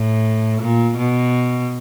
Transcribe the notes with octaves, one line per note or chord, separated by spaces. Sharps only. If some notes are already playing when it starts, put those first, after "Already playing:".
Already playing: A2
A#2
B2